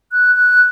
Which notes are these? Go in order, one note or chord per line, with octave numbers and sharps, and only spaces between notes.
F#6
F#6